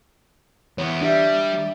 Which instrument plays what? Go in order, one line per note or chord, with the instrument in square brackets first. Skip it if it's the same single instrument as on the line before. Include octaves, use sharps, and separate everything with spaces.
[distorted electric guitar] E2 B3 [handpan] C#5
[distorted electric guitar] G3 [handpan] D4 G4 E5